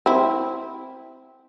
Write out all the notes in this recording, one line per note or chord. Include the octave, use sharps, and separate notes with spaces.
C4 E4